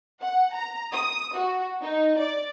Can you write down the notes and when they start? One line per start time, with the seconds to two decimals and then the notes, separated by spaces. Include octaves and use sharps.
0.21 F#5
0.54 A#5
0.92 D#6
1.35 F#4
1.82 D#4
2.19 D5